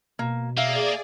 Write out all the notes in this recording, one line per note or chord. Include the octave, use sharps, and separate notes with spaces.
B2 A#3
A#3 G#4 D5 E5 F5